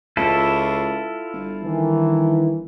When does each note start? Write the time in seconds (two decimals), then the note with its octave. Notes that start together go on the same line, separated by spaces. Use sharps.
0.17 C#2 E4 F4 A4
1.33 G1
1.64 D#3 E3